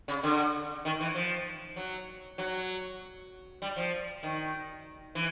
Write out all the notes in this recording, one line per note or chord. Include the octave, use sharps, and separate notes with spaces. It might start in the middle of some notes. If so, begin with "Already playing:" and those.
C#3
D3
D#3
E3
F3
F#3
F#3
G3
F3
D#3
E3